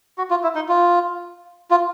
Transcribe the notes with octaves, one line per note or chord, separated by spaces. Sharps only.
F#4
F4
E4
D#4
F4
F4